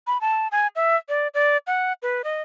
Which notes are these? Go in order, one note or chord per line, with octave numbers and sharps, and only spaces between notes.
B5
A5
G#5
E5
D5
D5
F#5
B4
D#5